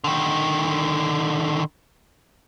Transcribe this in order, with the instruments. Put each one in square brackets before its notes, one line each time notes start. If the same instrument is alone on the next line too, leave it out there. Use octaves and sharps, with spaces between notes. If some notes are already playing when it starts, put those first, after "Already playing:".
[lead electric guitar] D3 D#3